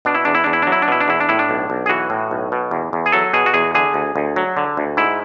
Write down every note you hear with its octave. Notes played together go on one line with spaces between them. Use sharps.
B2 D4
E4
E2 D4
E4
E2 D4
E4
D4
F#3 E4
D4
B2 E4
D4
E2 E4
D4
A2 E4
D4
B1
B1
G#4
E3 F#4
A2
B1
B2
E2
E2
G#4
F#3 A4
B2 G#4
F#4
E2 G#4
D3 G#4
D2
D2
F#3
D3
D2
G#2 E4